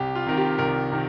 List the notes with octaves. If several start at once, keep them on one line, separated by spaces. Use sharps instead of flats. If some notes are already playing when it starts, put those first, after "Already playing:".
Already playing: C2 G4
F4
C3 D#3 A#4
G4
C2 A#4
C3 D#3